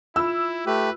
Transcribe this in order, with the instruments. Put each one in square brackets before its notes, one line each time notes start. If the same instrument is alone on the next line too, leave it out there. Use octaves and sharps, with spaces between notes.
[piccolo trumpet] E4 [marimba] F4 B5 [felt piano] E6
[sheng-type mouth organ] A3 G4 [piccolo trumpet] B4